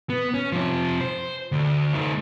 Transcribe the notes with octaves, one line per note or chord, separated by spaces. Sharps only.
B3
C#4
C3 F3
C5
D2
A3 D#4